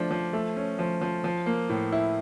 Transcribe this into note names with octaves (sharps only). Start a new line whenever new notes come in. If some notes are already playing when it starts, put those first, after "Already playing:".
Already playing: F3 A3 D4
F3
A3
C#4
F3
F3
F3
A#3
A2
E4